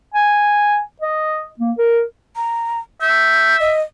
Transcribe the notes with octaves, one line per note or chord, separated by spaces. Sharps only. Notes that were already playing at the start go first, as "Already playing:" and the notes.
G#5
D#5
A#3
A#4
A#5
E5 G6
D#5